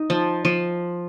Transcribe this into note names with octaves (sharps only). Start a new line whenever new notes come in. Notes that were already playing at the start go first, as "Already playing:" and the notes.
Already playing: D#4
F3
F3